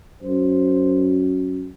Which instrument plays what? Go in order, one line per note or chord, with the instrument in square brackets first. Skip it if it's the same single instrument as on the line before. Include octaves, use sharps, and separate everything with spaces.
[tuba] F#2 [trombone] C5